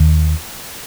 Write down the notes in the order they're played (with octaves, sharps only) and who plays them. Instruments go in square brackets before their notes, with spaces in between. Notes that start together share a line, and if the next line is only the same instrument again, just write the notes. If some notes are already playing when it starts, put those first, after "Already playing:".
Already playing: [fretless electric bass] D#2 D#3